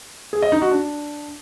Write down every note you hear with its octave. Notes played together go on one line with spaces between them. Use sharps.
G#4
D#5
D#4
F#4
D4